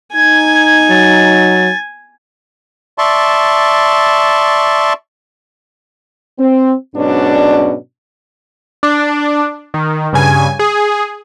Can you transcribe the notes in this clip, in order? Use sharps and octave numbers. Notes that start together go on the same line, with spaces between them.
D#4 G#5 G#6
F#3 A6
D5 E5 A5 C6 C#6
C4
G#2 B2 F#3 C#4 D4
D4
D#3
G2 C#3 G#5
G#4